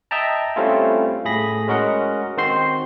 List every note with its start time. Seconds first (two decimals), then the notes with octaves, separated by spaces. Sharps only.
0.11 D#5 E5 G5 A5 A#5
0.56 G3 A3 C4 C#4 E4 F4
1.25 A2 G#4 B5 A#6
1.68 G#3 C#4 F#4 A#4 D#5 F#5
2.37 D#3 C4 F#4 C5 C6 C7